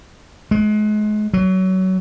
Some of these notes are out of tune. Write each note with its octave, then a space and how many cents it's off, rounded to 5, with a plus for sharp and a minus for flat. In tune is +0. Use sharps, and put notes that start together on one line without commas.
G#3 +35
F#3 +20